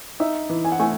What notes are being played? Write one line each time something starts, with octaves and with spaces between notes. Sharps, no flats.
D#4 E5
E3
G#5
F#5
A3 G#5